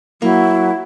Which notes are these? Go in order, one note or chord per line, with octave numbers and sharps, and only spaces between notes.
F#3 A#3 E4